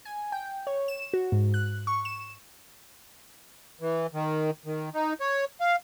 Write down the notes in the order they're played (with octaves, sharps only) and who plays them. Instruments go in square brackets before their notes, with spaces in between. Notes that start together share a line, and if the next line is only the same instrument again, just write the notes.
[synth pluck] G#5
G5
C#5
E7
F#4
G#2
F#6
C#6
E7
[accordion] E3
D#3
D#3
D#4
C#5
F5